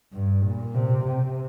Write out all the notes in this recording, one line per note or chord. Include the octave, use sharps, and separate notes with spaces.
G2
A#2
C3
C3